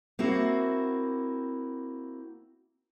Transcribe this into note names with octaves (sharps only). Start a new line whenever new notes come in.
A#3 C4 E4 F#4